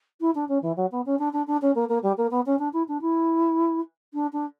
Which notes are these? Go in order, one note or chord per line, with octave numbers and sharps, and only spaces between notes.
E4
D4
C#4
E3
F#3
B3
C#4
D4
D4
D4
C#4
A#3
A#3
G3
A#3
B3
C#4
D4
E4
D4
E4
D4
D4